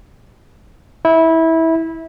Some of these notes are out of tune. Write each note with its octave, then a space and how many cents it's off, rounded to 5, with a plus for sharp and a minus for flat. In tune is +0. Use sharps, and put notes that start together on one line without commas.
E4 -20